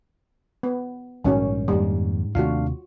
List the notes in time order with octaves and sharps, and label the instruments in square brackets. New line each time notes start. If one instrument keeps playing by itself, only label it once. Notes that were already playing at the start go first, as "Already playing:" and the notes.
[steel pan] B3
[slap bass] A#1 G#2 G3 [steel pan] D#3 C#4 F#4
[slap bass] F2 D#3 A#3 [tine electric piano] G#2 [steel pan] G3
[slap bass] D#2 C3 D#3 [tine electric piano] A3 D4 F5 [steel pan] F4 F#4